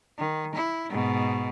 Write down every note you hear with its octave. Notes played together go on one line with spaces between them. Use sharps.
D#3
E4
G#2 B2